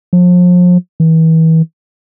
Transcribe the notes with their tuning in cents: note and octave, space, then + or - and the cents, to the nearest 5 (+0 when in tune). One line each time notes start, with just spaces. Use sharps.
F3 +35
E3 -35